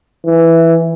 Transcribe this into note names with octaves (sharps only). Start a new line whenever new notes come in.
E3